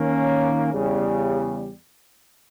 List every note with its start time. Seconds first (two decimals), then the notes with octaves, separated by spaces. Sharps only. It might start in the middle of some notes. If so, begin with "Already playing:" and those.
Already playing: D#3 A#3 C#4
0.73 E2 C#3 G3